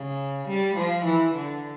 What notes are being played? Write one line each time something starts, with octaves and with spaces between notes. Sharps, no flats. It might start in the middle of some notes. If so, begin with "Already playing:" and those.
Already playing: C#3
G3
F3
E3
D3